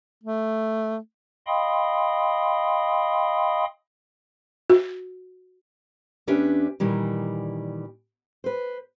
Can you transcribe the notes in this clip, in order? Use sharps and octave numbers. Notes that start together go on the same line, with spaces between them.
A3
D#5 F5 G5 B5 C6 D#6
F#4
E2 C#4 D4 G4 B4 E5
A#2 D#3 E3 G3
B4 C5